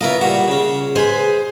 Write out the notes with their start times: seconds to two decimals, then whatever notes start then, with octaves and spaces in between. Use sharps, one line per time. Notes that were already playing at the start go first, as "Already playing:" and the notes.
0.01 C#3 B3 E4 F4 A#4 D#5
0.21 A#2 G3 F#4 F#5
0.48 C#3 C#4
0.95 G#3 G#4 B4 C5